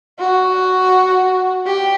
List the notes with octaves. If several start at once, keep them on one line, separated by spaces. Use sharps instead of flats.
F#4
G4